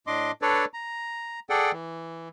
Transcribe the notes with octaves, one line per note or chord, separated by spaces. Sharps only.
A2 D4 D#5 C6 D6
D4 A4 B4 C#5 D5
A#5
G#4 A4 D5 F#5 G5
E3